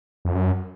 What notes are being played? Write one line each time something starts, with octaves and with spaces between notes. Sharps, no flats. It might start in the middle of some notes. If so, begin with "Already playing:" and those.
F2
F#2